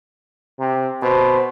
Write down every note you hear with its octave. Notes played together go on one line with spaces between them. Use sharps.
C3
B2 C5